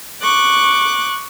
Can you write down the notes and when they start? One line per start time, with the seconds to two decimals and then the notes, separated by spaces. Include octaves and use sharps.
0.22 C#6 D6 F#6